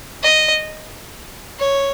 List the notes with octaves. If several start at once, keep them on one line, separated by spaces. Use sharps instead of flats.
D#5
C#5